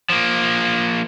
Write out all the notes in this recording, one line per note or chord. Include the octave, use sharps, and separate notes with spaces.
F3 A#3